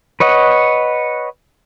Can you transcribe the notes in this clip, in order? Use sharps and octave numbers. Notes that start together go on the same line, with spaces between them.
B4 C#5 D#5 F#5